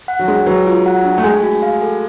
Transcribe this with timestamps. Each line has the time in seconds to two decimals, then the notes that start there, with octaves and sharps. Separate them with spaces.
0.08 F#5
0.19 F#3
0.28 G#3 D4
0.46 F#3 B4
0.66 F4
0.86 F#5
1.05 D4
1.18 A3
1.24 G#3 G#5
1.43 F#4
1.63 F5
1.82 A4